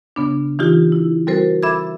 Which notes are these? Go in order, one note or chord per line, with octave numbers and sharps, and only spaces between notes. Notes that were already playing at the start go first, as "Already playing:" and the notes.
C#3 B3 D4
E3 D#4 F4 G4
E4
G3 C4 F#4 A4 A#4 C5
A4 E5 B5 D6 E6 G#6